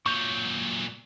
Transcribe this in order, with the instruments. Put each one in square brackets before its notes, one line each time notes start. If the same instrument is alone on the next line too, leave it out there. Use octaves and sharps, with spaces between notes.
[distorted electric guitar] A#2 F#3 [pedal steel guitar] C#6 G6